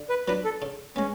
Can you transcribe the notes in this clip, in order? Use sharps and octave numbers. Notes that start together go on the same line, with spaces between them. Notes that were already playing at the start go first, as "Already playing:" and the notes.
Already playing: D3
B4
F#3 B3 D4 B4
A4
C#3
G#3 B3 C#4